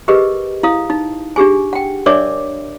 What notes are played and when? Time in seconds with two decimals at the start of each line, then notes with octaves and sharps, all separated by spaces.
0.08 G4 G#4 A#4 B4 D#5
0.63 E4 F5 D#6
0.90 D#4
1.36 D4 G4 G#4 G#5
1.73 F#5 G5
2.06 D4 A#4 C#5 D5 E5 D6